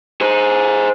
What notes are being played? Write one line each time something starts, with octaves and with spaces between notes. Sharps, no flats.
G#4 C5